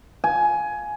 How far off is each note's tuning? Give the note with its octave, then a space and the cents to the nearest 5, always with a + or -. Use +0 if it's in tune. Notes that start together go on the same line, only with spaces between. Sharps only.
G#5 +15